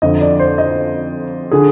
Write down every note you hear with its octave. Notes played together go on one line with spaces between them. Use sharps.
F2 D3 D#5
D5
C5
D#5
D3 G#4